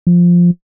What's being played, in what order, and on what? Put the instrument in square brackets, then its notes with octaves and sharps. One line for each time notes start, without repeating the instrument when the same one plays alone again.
[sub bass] F3